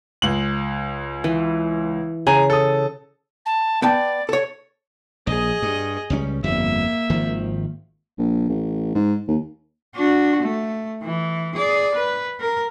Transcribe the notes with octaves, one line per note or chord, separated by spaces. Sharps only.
C#2 F#7
E3
C#3 G#4 G#5 A#5
A4 D#6
A5
B3 D5 G5 A5
A4 C#5
A#1 G#4 D#5
G2
C#2 G3 C#4
G1 F2 G3 A#3 E5
G#1 D#3 F3
A#1
A1
G#2
D#2
D4 F#4
A3
E3
G#4 D5
B4
A#4